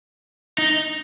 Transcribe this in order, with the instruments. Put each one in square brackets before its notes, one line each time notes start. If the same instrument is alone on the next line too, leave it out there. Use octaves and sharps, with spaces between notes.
[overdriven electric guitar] D#4